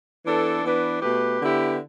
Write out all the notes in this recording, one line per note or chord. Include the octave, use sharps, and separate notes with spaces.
E3 B3 D4 A4
E3 B3 D4 B4
B2 A3 G4 B4
D3 B3 E4 G4